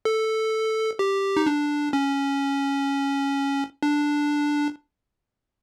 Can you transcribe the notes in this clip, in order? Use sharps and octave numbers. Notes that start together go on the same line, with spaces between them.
A4
G4
D#4
D4
C#4
D4